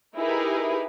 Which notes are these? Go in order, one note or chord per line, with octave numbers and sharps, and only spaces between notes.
D#4 E4 G4 G#4 A#4 B4